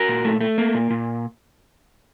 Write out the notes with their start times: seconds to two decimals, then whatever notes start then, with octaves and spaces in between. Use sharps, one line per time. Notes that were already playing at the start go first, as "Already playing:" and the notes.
Already playing: F#4 A#4
0.09 A#2
0.25 A3
0.41 A3
0.58 A#3
0.75 A#2
0.90 A#2